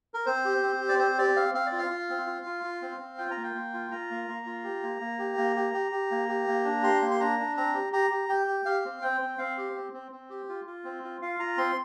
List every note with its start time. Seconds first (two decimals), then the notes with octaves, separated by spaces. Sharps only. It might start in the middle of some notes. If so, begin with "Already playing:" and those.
0.14 A#4
0.26 C4 C5
0.45 G4
0.63 C4
0.81 G4
0.89 D5
0.99 C4 C5
1.18 G4 D5
1.36 C4 F5
1.54 C4 F5
1.66 D5
1.72 F4
1.78 F5
1.90 F4
2.10 C4
2.27 F4
2.46 F4
2.64 F4
2.82 C4
3.00 C4
3.18 F4 G5
3.31 A#5
3.37 A#3
3.44 G5
3.54 A#3
3.74 F4
3.91 F4 A#5
4.10 A#3
4.28 A#3
4.46 F4
4.64 G4
4.83 A#3
5.00 A#3
5.19 G4
5.37 A#3
5.56 G4
5.73 G4
5.92 G4
6.11 A#3
6.29 G4
6.48 A#3
6.65 D4
6.83 G4 C6
7.02 A#3
7.11 C6
7.20 D4 A#5
7.39 D4
7.57 C4 A#5
7.75 G4
7.92 G4 A#5
8.11 G4
8.29 G4 G5
8.47 G4
8.65 G4 F5
8.85 C4
9.02 C4 G5
9.21 C4
9.38 C4 F5
9.58 G4
9.76 C4
9.93 C4
10.12 C4
10.30 G4
10.49 F4
10.66 F4
10.84 C4
11.04 F4
11.22 F4 F5
11.39 F4 A#5
11.57 C4 C6